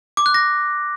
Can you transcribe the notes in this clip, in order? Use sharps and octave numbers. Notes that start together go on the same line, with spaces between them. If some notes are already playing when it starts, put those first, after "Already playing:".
D6
F#6
A#6